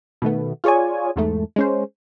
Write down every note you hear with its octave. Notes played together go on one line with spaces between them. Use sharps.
B2 D#3 A3 B3
F4 G#4 C#5 D5 G#5
E2 G#2 A3
G#3 C#4 C5